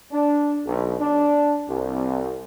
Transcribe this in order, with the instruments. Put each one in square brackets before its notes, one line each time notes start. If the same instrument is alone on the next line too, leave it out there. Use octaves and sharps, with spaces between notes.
[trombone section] D4
B1
D4
C2